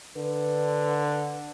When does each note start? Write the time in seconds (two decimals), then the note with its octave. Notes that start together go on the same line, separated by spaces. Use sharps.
0.17 D3 B4